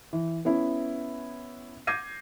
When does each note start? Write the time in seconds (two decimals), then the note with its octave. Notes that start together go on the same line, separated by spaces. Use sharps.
0.13 E3
0.45 B3 C#4 E4
1.87 D6 G6 G#6 A#6 C7 D#7